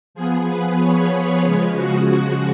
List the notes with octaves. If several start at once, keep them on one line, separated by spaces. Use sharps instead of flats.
F3 B3 G#4
B4
C#5
C#3 F3 G#3
F#4